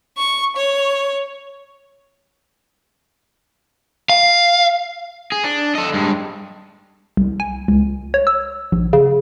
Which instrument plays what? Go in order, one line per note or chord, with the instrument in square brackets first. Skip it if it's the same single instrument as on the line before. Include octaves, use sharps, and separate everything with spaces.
[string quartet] C#6
C#5
[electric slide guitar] F5
[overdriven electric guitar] G#4
D4
A4 D#5
G2 G#3
[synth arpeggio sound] C2
G#5
C#2
C#5
E6
A#1
C#3